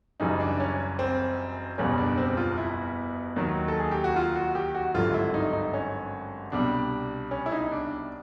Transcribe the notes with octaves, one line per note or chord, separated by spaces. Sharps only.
F#1 F#2 C#3 E3 G3 D#4
D4
C#4
C4
F#1 E2 B2 G3 C#4
D4
C4
F4
E4
D#2 D#3 F#3
A4
G#4
G4
F#4
F4
F#4
G4
F#4
G#1 G2 D3 F#3 F4
E4
D#4
D#4
C#4
C2 B2 G3 D4
C#4
E4
D#4
D4